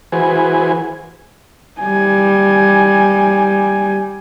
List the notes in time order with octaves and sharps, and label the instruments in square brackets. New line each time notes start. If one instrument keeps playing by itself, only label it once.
[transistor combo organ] E3 F#4 G#4 B4 C5 G#5
[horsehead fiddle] G3 G#5